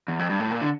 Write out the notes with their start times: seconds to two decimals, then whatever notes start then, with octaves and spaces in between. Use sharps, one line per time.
0.08 E2
0.19 F2
0.30 G2
0.40 A2
0.51 A#2
0.61 D3